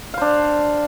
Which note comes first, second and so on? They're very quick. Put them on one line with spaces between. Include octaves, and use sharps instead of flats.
F5 C5 D4